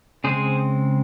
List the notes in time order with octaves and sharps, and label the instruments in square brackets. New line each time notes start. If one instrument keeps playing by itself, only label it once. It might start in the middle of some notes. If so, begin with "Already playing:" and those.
[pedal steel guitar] C#3 G#3 C4 G#4 C5